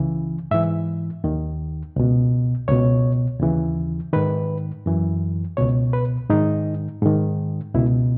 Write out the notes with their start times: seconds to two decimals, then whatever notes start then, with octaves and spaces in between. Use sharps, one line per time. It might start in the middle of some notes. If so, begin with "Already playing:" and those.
Already playing: C#2 C#3 E3
0.51 G#2 E3 E5
1.24 D#2 D#3
1.96 C#2 B2
2.68 C#2 B2 C#5
3.40 D#2 C#3 E3
4.13 G#2 D#3 B4
4.86 F#2 E3
5.57 C#2 B2 C#5
5.93 B4
6.29 G#2 D#3 D#4
7.02 G#2 D#3
7.74 C#2 B2 E4